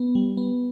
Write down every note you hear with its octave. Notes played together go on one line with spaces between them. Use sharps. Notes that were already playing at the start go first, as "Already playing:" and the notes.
Already playing: B3
G3
B3